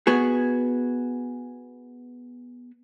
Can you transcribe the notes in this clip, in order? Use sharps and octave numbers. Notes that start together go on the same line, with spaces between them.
B3 F#4 G#4